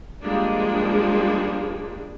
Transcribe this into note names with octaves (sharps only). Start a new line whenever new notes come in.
F3 G3 G#3 A#3 D4